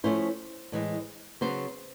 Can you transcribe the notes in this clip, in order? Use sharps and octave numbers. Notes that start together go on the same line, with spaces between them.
F3 A3 C#4 E4 C5
A2 E3 G#3
C#3 F#3 B3 C5